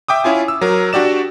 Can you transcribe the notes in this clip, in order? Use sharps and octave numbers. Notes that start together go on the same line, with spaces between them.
E5 G5 D6 D#6
C#4 E4 F4 G#5
E6
F#3 A#4
D4 F#4 G4 D5 E7